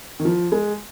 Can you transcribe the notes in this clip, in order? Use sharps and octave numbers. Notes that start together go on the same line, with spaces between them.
D#3
F3
G#3